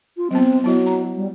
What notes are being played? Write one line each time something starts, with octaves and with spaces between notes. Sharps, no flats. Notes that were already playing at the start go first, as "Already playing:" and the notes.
F4
F#3 B3 C4
F#3 B3 E4 D#5
A#5
G3